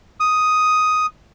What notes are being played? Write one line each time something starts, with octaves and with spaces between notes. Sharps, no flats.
D#6